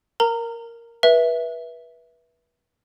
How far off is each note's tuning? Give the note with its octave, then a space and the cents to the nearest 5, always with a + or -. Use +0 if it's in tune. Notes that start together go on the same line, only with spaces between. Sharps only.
A#4 +0 A#5 -25
B4 -25 E5 +0